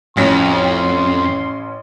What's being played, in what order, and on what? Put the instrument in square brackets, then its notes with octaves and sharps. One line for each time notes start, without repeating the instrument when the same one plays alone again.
[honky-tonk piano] A1 C#4 A#6 [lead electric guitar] F2 [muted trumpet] C6